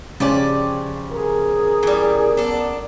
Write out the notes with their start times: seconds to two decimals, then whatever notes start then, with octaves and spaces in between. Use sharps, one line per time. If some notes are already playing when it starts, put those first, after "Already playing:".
0.20 C#3 F3 C#4 G4 D5
1.13 G#4 A#4
1.83 E3 G3
2.37 B3 D4 A4